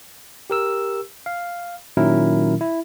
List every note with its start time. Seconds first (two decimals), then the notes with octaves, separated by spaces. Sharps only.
0.50 G4 A#4 E6
1.26 F5
1.97 A#2 D#3 F#3 C#4 E4 A#4
2.61 E4